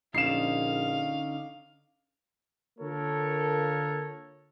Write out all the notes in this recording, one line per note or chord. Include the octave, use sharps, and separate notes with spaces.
A#1 D3 C#4 D#4 F5 C7 E7
D3 A#3 F4 A4 A#4 C#5